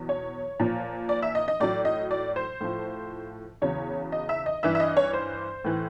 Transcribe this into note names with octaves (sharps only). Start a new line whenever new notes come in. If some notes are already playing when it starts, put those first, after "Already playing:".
Already playing: E2 B2 F#3
C#5
A#2 F3
D5
E5
D#5
D#5
A2 F#3 D5
D#5
D5
C5
A2 F3
E2 C#3 F#3 C#5
D#5
E5
D#5
G2 E3 E5
E5
D#5
C#5
C5
A2 E3